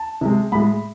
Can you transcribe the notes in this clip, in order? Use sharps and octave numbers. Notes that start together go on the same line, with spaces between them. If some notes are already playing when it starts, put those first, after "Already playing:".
Already playing: A5
C3 G#3
A2 G#3 B5